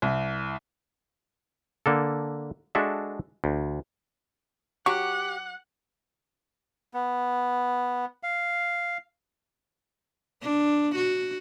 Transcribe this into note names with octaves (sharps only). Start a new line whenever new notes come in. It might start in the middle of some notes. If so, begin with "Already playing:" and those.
C2
D3 A#3 A4
G#3 D4 F#4 A4 E5
D2
F#3 G4 F#5 C#6
B3
F5
D4
F#4